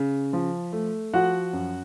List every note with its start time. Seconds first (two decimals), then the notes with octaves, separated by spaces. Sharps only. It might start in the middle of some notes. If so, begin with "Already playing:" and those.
Already playing: C#3
0.33 F3
0.73 A3
1.13 F3 F#4 F#5
1.53 F#2